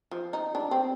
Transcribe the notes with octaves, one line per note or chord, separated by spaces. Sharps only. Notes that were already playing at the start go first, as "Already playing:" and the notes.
F3
D#4
D4
C4